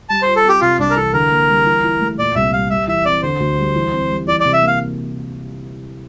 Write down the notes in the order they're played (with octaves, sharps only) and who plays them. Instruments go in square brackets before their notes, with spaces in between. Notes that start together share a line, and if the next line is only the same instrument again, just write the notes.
[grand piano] G3 [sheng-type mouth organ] A5
[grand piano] F4 [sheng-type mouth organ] C5
[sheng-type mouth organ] A4
[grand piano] C4 [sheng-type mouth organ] G4
[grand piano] C3 [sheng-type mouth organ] F4
[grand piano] C2 [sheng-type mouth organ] D4
[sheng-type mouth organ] A#4
[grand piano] E3 [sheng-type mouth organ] A4
[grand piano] D3 [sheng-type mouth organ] A#4
[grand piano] A#3
G3
E3
E4
A3
[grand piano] A#2 [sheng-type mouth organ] D5
[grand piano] C2 [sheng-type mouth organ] E5
[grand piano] G3 [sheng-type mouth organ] F5
[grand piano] G3 [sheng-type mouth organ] E5
[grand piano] E3 [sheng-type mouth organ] E5
[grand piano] C4 [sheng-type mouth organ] D5
[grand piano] D3 [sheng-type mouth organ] C5
[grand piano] D2
G3
E3
C4
G3
[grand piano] E3 [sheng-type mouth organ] D5
[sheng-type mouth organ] D5
[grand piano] C3
[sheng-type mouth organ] E5
[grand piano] A#3
[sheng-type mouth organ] F5